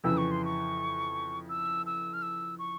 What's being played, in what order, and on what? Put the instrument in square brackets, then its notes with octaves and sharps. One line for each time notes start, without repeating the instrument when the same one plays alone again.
[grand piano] F2 C#3 E3 [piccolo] E6
[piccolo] C#6
C6
C#6
E6
E6
F6
E6
C#6